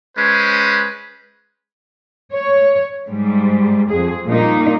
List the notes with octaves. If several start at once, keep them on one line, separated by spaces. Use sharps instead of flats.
G#3 C#4 B4 C5
C#5
G#2 G3
F2 G#4
A#2 G3 A#3 D#4